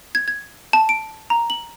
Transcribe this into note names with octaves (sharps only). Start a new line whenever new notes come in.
G#6
G#6
A5
D7
A#5
F#7